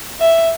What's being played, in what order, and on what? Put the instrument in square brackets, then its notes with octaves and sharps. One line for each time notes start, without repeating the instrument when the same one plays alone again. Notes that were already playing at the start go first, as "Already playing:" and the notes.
[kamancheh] E5